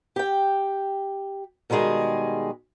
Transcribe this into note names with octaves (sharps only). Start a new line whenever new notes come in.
G4 G5
B2 D#3 G3 G#3 G#4